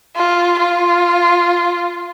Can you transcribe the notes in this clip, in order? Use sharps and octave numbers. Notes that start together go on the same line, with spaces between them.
F4
F4